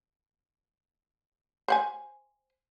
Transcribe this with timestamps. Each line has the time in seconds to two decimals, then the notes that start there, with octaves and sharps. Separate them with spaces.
1.68 C5 F#5 G#5